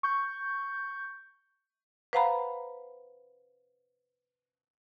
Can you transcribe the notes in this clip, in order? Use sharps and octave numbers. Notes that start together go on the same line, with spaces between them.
C#6 G6
B4 C5 F5 F#5 A#5 B5